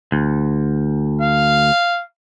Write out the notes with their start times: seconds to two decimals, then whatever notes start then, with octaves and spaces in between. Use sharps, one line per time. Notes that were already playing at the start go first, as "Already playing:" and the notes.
0.12 D2
1.22 F5